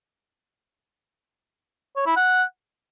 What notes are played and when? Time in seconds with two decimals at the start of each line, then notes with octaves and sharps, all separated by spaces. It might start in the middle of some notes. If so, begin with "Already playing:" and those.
1.96 C#5
2.06 E4
2.16 F#5